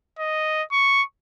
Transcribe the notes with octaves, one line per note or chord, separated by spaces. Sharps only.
D#5
C#6